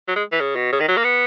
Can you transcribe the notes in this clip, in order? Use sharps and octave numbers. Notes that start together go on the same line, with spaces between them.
F#3
G#3
E3
C#3
B2
C#3
D#3
F#3
A#3
B3